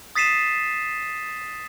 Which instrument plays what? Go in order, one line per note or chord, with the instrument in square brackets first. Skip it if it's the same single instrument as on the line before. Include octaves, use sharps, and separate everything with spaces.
[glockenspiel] D#6 A6 B6 C7 D#7 E7